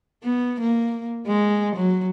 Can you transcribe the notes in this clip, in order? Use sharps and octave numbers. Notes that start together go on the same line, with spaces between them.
B3
A#3
G#3
F#3